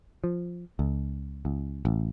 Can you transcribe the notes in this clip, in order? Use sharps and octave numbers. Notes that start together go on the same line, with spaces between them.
F3
C#2
C#2
A1